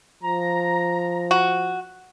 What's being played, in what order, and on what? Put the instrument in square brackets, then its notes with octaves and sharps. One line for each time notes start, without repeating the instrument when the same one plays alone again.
[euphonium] F3 [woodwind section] A#5
[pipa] F#4